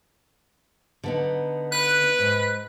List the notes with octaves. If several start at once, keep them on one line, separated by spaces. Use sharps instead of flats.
D3 B3 D#4
B4 F#6
G#2